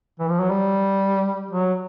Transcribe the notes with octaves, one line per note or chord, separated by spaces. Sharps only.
E3
F3
F#3
G3
F#3